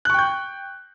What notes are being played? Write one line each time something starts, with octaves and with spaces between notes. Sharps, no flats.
G5 C#6 F#6 G6